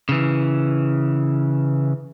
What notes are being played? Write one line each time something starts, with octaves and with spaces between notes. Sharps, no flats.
C#3 E3